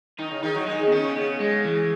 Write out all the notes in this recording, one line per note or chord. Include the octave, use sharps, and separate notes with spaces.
D#3 D#4
C#3
D#3 D#4
F#3
G#3 D#4
D#3
B3
D#3 C#4
C#3
C#3 B3
C#3 G#3
E3